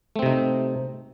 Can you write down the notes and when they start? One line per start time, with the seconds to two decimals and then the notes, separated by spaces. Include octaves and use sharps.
0.16 A3
0.19 C4
0.23 C3
0.26 D#4